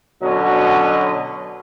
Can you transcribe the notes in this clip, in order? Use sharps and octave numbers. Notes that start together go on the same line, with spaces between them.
B2 D3 F#3 C#4 D#5